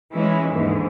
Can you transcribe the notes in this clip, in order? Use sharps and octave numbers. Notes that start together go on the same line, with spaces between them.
E3 G#3 C#4 E4
D#2 G#2 D3 E3